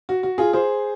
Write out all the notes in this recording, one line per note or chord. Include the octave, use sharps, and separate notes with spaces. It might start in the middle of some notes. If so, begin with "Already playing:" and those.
F#4
F#4
F4 G#4
G#4 C5